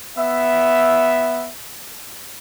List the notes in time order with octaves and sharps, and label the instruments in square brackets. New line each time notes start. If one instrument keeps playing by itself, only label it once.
[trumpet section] B3 E5